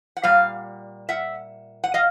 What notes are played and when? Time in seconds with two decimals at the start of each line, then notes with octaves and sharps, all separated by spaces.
0.17 F#5
0.23 A#2 G3 F5
1.09 E5 F#5
1.84 F#5
1.94 D#5 F5